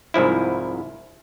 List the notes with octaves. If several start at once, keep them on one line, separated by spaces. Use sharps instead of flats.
C2 G#2 F3 E4